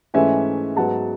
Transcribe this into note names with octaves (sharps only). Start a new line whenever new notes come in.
G#2 E3 A3 C#4 E5 G#5
G#2 F#3 B3 F#5 A5